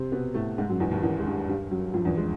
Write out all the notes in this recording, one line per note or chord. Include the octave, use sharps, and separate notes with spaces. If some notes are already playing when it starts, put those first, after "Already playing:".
Already playing: C3 C4
B2 B3
A2 A3
G#2 G#3
F#2 F#3
E2 E3
D#2 D#3
E2 E3
G#3
G2 G3
G2 G3
F#2 F#3
F2 F3
E2 E3
G#3